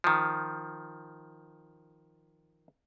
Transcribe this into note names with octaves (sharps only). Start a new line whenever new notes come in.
D#3 F3